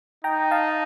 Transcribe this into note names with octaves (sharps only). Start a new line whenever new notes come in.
D#4 G5 A#5
F5 A5